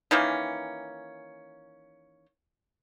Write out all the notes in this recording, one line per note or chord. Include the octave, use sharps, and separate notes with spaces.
D#3 E3 A#3 C#4